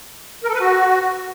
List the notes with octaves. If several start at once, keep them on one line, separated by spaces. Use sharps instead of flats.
A#4
A4
B4
F#4